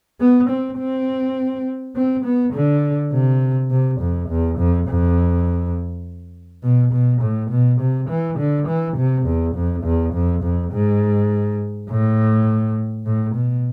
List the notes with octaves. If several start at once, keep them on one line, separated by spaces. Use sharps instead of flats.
B3
C4
C4
C4
B3
D3
C3
C3
F2
E2
F2
F2
B2
B2
A2
B2
C3
E3
D3
E3
C3
E2
F2
E2
F2
F2
G#2
A2
A2
B2